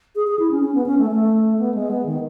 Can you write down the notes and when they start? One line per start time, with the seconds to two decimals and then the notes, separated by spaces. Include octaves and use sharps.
0.16 G#4
0.27 G#4
0.39 E4
0.51 C#4
0.63 C#4
0.75 B3
0.86 C#4
0.99 A3
1.11 A3
1.59 B3
1.75 G#3
1.91 B3
2.06 D#3